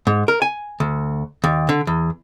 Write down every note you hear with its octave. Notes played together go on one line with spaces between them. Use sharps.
G#2
A#4
G#5
D2
D#2
D3
E2